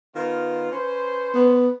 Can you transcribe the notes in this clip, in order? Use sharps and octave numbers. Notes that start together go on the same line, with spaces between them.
D#3 B3 F4
C#4 B4 C5
B3